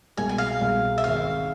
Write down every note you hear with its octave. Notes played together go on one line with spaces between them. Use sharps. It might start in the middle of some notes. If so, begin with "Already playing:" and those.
C2 B2 G#3 G#5
G#5
F5
C2 B2 G#3
E5
G#1 G#2 G#3 C4 F5